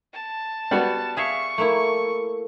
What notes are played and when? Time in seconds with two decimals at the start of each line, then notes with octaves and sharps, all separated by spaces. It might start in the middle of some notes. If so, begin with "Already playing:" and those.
0.14 A5
0.71 G3 B3 F#4 F#5
1.17 G#4 E5 F5 C#6
1.58 A3 A#3 E4